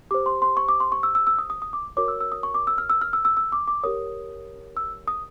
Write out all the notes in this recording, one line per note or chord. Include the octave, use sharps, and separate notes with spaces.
G4 C5 D6
C6
C6
C#6
D6
C6
C#6
E6
E6
E6
D#6
D#6
D#6
D6
F#4 A#4 C#5 D6
E6
E6
D#6
C#6
D6
E6
F6
E6
F6
E6
E6
E6
D6
D6
G4 A#4 C#5 D#6
E6
D#6